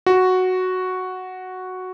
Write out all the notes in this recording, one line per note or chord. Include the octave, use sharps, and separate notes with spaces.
F#4